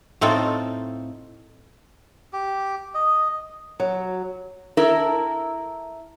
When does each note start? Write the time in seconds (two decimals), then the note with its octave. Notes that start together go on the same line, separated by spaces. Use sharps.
0.21 A2 A3 C4 D#4 F4 A4
2.33 G4
2.94 D#5
3.80 F#3
4.77 E4 A4 A#4